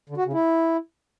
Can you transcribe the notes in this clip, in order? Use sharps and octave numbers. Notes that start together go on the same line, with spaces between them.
D3
F#4
C#3
E4